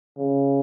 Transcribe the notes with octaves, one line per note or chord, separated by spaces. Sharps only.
C#3